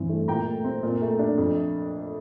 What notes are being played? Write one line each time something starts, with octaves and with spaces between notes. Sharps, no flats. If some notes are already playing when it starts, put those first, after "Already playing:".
Already playing: G2 E3 C4
A3
A#2 G5 A#5
A3
C4
A#2
A3
D4
F2